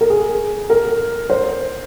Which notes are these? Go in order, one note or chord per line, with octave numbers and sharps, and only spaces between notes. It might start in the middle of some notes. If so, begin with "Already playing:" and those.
A#4
G#4
A#4
C5